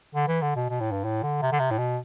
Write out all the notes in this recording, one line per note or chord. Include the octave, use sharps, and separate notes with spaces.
D3
E3
D3
B2
B2
A2
G2
A2
D3
C3
D3
C3
A2
B2